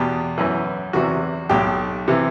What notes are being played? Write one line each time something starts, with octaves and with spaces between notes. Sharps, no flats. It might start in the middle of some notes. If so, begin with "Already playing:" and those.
Already playing: E2 B2 G4
F#2 E3
E2 C3 E3 F#4
B1 B2 G4
C3 E3